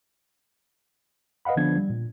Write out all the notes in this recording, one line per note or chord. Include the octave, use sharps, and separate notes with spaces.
B4 D#5 F5 F#5 B5
D3 F3 B3 D4 G#6
G3
A#2